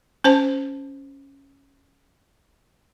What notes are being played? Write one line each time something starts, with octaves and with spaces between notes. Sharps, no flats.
C#4 C5 A5